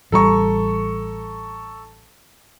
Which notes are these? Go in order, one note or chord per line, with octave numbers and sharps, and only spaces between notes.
A1 G3 A4 A#5 C#6